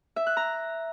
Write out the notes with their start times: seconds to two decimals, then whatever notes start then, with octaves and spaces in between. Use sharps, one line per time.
0.16 E5
0.27 F#6
0.37 A#5